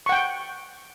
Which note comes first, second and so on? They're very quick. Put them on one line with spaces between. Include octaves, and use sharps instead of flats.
C#6 F#5 G5